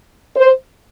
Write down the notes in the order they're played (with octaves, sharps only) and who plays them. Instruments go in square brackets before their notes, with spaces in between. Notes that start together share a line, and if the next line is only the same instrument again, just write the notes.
[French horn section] C5